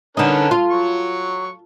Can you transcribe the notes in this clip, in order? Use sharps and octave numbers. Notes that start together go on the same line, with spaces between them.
D3 C#4 D#4 A#4 B4
F4
F#3 C#6